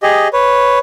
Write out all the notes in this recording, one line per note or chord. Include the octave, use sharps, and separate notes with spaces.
G4 G#4 D#5
B4 C#5